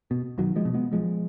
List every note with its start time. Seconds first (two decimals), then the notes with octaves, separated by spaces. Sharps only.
0.11 B2
0.38 B1 D#3 F#3
0.56 F3 G#3
0.65 B2
0.74 G#3 B3
0.92 B1 F3 G#3